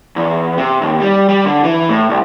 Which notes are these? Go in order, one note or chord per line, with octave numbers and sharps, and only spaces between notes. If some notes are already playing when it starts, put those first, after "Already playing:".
E2
C3
D#2
G3
G3
D3
E3
A2
C2